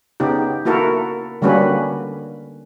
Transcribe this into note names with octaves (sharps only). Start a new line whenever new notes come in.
C#3 B3 D#4 G4
A#3 E4 F#4 A4 A#4
D3 G3 A#3 C#4 F#4 B4